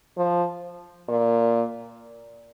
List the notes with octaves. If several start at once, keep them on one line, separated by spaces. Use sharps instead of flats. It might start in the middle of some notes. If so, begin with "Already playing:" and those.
F3
A#2